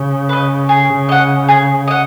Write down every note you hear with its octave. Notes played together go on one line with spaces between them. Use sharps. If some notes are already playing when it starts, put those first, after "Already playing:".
Already playing: C#3
B4 D#5
G#4
D#5 F#5
G#4
D#5 F#5